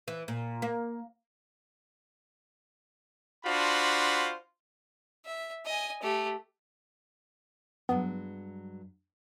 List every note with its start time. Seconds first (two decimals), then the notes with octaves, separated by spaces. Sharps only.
0.08 E3
0.28 A#2
0.62 A#3
3.45 D4 F4 F#4 C5 B5
5.26 E5
5.65 D#5 G#5
6.02 A3 G4
7.89 G2 F#3 G#3 B3